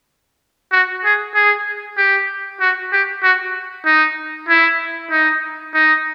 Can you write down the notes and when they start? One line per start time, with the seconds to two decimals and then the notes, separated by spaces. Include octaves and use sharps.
0.72 F#4
1.05 G#4
1.35 G#4
1.98 G4
2.61 F#4
2.93 G4
3.23 F#4
3.86 D#4
4.49 E4
5.11 D#4
5.74 D#4